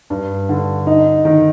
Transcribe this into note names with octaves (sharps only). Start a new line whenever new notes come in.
G2
D3
D#4
D#3